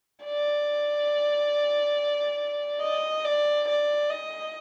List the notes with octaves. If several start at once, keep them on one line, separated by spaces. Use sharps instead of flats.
D5
D#5
D5
D5
D#5